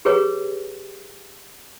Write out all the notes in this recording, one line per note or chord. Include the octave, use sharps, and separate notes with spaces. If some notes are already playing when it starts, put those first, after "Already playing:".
G4 G#4 B4 C#5 A#5 C#6